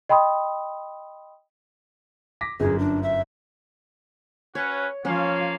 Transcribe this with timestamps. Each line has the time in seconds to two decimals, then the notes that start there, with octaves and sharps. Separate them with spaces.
0.09 D#5 G5 B5 C6 D#6
2.41 D6 A#6 B6
2.60 G1 F#2 G#4
2.79 D4
3.03 E5
4.55 C#4 F#4 B4 C#5
5.05 F3 A#3 C#4 F4 C#5 F5